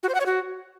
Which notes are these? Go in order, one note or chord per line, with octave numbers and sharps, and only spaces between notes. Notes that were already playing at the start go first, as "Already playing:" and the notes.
F#4
C5
F#5
C#5
F#4